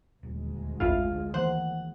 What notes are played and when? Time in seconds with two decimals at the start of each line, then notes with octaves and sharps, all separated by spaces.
0.23 D#1 D2 G#3
0.80 A1 F2 E4 F4
1.34 D#3 E3 A#3 C5 F#5